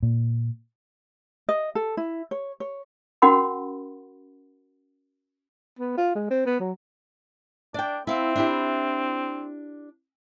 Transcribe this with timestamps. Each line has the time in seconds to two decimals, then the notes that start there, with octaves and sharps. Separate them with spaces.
0.03 A#2
1.49 D#5
1.75 A4
1.97 E4
2.31 C#5
2.60 C#5
3.22 C#4 F#4 A#4 F#5 B5 C6
5.79 B3
5.98 F4
6.16 G#3
6.30 C4
6.46 B3
6.60 F#3
7.74 D4 D5 G5
8.07 C4 E4 F5
8.36 D4 E4 G4